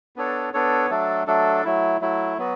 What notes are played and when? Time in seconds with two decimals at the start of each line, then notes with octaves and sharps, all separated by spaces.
0.16 B3 D4 A4 C#5
0.54 B3 D4 A4 C#5
0.90 F#3 A3 D4 A4
1.27 F#3 A3 D4 A4
1.64 F#3 A3 E4
2.01 F#3 A3 E4
2.38 F#3 B3 F#4